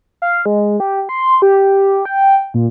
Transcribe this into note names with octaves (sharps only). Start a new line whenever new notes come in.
F5
G#3
G4
C6
G4
G5
A#2